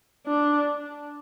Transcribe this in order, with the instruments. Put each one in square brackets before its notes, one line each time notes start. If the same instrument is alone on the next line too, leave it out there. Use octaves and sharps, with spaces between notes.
[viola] D4